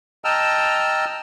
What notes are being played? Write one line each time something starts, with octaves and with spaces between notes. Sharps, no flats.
D#5 G5 A5 A#5 E6 F6